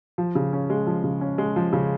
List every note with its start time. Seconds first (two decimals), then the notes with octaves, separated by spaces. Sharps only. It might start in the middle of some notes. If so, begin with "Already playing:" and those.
0.18 F3
0.35 C#3
0.53 C#4
0.70 G#3
0.87 F3
1.04 C#3
1.21 C#4
1.38 G#3
1.56 F3
1.73 C#3